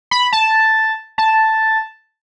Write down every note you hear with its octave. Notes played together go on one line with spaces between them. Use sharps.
B5
A5
A5